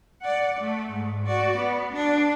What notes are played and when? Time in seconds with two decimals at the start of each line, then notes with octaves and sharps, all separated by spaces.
0.22 D5 F#5
0.60 A3
0.92 G#2
1.26 F#4 D5
1.58 B3
1.93 D4